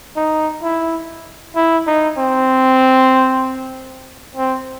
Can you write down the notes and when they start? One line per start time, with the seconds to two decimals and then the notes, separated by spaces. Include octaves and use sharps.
0.16 D#4
0.63 E4
1.56 E4
1.87 D#4
2.18 C4
4.36 C4